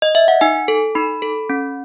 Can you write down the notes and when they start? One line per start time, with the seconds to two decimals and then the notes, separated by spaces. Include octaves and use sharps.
0.02 D#5
0.15 E5
0.28 F#5
0.41 D#4 G#5
0.68 A4
0.95 D#4 B5
1.22 A4
1.50 C#4